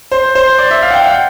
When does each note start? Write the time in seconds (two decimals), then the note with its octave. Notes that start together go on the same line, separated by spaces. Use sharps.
0.11 C5
0.35 C5
0.59 D5
0.71 E5
0.82 F5
0.91 F#5
0.94 G5
1.06 G5